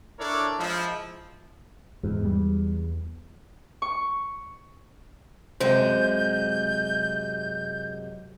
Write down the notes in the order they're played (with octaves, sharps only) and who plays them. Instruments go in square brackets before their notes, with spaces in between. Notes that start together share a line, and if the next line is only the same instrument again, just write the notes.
[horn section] D4 E4 A4 A#4 C#5 D5
F3 G#3 E4
[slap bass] E2 [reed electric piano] G#2
[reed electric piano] G3
[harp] C#6
[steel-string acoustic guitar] F#2 C3 G#3 [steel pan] C5 [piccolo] G6